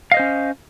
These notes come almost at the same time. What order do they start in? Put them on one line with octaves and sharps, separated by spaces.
F5 D#5 C5 C#4